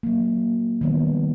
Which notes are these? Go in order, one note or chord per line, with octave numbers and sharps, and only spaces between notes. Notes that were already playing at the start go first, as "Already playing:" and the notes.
F#3 A#3
D#3 F3 G3 B3